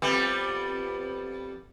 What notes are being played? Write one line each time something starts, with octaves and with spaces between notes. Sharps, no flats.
F2 G3 B3